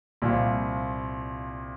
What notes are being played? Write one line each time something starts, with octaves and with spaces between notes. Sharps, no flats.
C2 A#2 F3